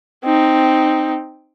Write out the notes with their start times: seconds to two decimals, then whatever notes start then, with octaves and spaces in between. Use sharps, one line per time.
0.25 C4 D#4